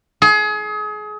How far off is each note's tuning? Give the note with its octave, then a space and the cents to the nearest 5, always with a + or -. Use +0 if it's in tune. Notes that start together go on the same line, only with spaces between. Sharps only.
G#4 +30